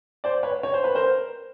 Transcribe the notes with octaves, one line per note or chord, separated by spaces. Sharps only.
C5 D5
B4 C#5
C#5
C5
B4
A#4 C5